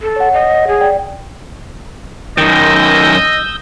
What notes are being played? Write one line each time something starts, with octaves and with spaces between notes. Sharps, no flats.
A4
C#5 F#5
D#5
G#4
D5 G5
F#2 D#3 D#5 D#6 E6 G6